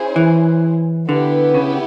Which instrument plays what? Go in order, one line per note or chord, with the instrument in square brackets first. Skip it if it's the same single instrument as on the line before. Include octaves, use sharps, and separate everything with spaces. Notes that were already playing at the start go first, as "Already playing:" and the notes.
Already playing: [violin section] C#4 E4 G#4 C5
[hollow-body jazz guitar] E3
[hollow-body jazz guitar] D3 [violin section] B3 E4 G4 B4
[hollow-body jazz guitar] C#3